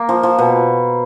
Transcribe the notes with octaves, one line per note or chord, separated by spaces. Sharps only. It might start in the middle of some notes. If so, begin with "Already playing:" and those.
Already playing: A#3
F3
F3
B2